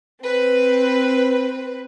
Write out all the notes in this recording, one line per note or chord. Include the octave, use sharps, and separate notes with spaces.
C4 B4